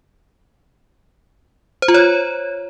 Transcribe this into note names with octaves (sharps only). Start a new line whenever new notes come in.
C5
F4
C#5